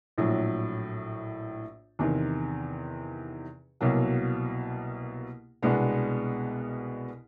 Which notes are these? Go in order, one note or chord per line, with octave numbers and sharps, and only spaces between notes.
A#1 A2 F#3
E2 C3 D#3
C2 B2 F#3 A#3
C2 B2 G#3 B3 D4